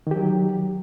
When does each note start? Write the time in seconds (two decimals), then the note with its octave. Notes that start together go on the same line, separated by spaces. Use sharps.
0.07 D#3
0.11 G4
0.16 F#3